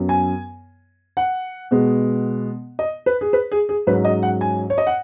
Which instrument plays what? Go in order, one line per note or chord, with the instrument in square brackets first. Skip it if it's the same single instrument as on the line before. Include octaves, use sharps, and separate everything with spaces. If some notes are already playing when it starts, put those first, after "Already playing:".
Already playing: [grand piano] F#2 F#3 B3
G#5
F#5
B2 G#3 B3
D#5
B4
G#4
B4
G#4
G#4
G#2 F#3 C#4 B4
D#5
F#5
G#5
C#5
D#5
F#5